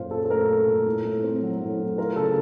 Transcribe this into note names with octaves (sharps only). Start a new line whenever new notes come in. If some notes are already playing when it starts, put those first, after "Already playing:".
Already playing: F#2 A#2 F4 C5 F5
C#4 A4
A4
A3 A#4
F4
A#2
A2
A2
C4
F#3
A2
A2
F4 A#4
C#3 A4